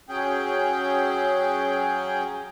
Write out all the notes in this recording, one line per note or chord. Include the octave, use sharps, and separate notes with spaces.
F#3 C#4 G#4 G5